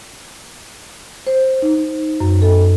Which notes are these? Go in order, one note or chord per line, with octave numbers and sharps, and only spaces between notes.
C5
D#4
F#2
A4